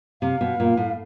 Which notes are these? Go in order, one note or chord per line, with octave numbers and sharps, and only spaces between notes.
C3 F5
B2
A#2
A2